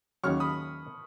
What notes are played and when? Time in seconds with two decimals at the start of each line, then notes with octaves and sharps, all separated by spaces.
0.24 D#2 C#3 F#3 C#6 F6
0.40 B5 D#6